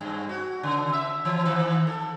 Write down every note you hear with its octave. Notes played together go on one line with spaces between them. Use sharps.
G2
F#4
C#3
E5
E3
D#3
A4